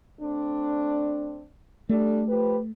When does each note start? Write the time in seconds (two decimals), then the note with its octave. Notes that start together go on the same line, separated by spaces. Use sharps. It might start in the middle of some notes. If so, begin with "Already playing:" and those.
0.20 A3 C4 D4
1.89 G3 A3 D4 A4
2.27 F3 G4 B4